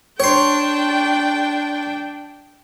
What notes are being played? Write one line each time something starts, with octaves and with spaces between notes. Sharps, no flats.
D4 C#5 G5 C6